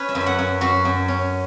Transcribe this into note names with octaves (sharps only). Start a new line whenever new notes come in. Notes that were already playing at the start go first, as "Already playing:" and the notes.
Already playing: C#4 B4
E5
F#2
E5
F#5
F#2
F#2 F#4
F#2
C#4